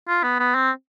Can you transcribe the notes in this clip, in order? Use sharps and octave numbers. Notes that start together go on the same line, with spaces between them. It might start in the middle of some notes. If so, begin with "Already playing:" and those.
F4
B3
B3
C4